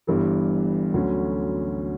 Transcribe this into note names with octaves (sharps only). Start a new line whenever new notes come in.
G1 G2 E3 G3
D2 D3 F#3 C#4